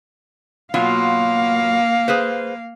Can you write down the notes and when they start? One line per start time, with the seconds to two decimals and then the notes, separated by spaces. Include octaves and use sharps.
0.74 B2 F#3 A#3 F4 F5
2.08 G#4 B4 C5